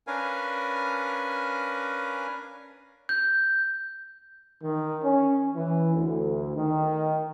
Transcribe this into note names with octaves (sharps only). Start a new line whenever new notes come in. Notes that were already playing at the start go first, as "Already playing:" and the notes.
C#4 D4 A#4 B4 F5 G#5
G6
D#3
C#4
E3
D2
D#3